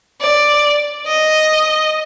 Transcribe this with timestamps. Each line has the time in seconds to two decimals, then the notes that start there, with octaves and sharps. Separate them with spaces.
0.21 D5
1.07 D#5